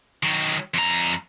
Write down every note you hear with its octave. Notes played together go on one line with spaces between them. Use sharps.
D#3 F#3
F2 A#5